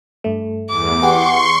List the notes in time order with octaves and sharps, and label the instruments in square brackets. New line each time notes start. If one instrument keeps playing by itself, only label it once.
[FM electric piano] G2 A3
[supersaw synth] E2 [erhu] D6
[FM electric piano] G4 G#4 B4 [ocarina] F#5 [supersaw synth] C6 C#6